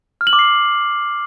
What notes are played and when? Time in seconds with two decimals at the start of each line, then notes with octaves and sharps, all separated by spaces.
0.21 F6
0.27 F#7
0.33 D6
0.39 C7